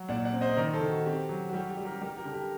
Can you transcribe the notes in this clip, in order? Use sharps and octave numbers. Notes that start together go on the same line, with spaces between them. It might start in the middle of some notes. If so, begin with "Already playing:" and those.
Already playing: F#3
A#2 D5 F#5
D5 F#5
C4
C5 D#5
D#3 A#4 D5
A4 C5
D#3
F#4
C4 G4
F#3
F#4
G3 G4
G4
G3
G4 A#4
G3 G4 A#4
G4 A#4
D3
G4 A#4